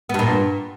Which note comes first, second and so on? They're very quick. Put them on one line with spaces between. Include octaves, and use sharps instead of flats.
B3 G2 A#2